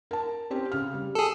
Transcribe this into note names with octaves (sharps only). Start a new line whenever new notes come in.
A#4 A5
C4 C#4 G4
C#3 F6
G3
G#4 A4